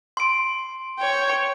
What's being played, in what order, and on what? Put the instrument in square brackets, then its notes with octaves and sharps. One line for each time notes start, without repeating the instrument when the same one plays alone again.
[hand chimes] C6 D7
[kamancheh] C#5 G5